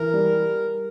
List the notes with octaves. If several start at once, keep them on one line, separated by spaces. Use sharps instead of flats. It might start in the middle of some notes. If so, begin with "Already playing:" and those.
Already playing: E3 A#4
G3